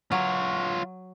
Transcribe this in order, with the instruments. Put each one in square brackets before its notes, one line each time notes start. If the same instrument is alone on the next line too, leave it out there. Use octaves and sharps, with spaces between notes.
[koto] F#3 [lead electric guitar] F4 C#5